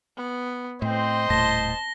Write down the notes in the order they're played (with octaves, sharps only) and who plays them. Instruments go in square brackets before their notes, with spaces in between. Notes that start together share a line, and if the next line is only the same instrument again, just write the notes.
[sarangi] B3
[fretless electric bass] A2 [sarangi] C4 [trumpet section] C5 D#5 C6
[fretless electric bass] D#1 A2 [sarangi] A5 [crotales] A#6 G7